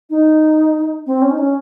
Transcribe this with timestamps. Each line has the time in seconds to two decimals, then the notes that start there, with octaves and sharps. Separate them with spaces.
0.10 D#4
1.06 C4
1.22 C#4
1.31 D#4
1.38 C#4